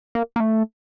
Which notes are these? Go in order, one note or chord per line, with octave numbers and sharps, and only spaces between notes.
A#3
A#3
A3